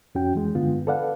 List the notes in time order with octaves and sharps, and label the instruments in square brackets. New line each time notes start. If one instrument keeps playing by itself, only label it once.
[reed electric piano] F2 C#4 F#4 G5
E3 G#3
G2 D3 B3 F4
A4 B4 D5 F5 F#5